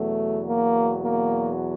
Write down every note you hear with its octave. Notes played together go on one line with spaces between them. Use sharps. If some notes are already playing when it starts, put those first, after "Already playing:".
Already playing: E2 B2 F#3 A3
A#3
A#3